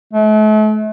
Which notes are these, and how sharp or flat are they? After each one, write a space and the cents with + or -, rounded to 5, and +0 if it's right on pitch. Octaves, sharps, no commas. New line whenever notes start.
A3 -40